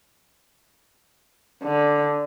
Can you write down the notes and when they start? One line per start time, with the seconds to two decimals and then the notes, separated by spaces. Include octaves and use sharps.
1.64 D3